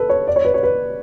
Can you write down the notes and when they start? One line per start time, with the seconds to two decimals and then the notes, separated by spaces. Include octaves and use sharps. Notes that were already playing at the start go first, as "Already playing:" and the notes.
Already playing: A4 B4
0.10 C#5
0.27 D5
0.36 C#5
0.45 B4
0.54 C#5
0.63 B4